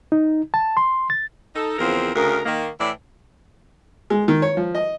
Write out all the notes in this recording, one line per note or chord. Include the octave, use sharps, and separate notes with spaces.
D#4
A5
C6
A6
D#4 A4
E2 C#3 F3 C4 A#4
D2 C#3 A#4
D#3 A#3
A2 E3 D5 E5
G#3
D#3
C#5
F3
D#5